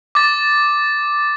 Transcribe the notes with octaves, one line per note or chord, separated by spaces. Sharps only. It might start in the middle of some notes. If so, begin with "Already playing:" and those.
D6 A6